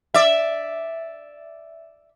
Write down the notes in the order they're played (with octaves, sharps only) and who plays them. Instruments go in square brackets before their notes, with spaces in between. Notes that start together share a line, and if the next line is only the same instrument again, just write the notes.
[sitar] D5 E5